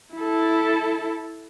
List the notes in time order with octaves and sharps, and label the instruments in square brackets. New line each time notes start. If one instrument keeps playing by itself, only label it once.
[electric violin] E4 A4